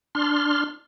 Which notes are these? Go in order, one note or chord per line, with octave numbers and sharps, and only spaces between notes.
D4 C6 F6